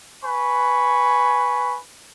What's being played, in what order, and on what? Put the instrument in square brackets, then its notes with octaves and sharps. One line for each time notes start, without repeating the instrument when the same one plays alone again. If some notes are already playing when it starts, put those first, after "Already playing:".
[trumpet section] B4 G#5 C#6